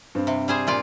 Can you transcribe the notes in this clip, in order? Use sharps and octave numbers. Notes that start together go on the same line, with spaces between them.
G2 C4
C3
G3 G#4 C5
A#2 F4 D5